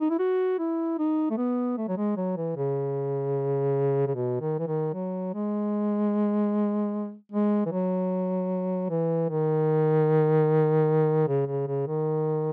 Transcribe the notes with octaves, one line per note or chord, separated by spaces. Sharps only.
D#4
E4
F#4
E4
D#4
A3
B3
A3
F#3
G#3
F#3
E3
C#3
C#3
B2
D#3
E3
D#3
F#3
G#3
G#3
E3
F#3
E3
D#3
C#3
C#3
C#3
D#3